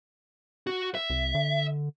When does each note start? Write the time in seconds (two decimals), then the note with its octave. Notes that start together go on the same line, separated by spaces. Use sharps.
0.67 F#4
0.95 E5
1.10 C2
1.35 D3